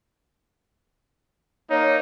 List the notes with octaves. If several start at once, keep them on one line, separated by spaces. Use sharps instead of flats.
A#3 D#4 C#5